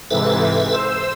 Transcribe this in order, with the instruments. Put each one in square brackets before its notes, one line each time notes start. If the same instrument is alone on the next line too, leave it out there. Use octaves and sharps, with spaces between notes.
[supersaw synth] G#2 C3 E3 [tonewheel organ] A4 B4 E5
[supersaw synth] C5 E6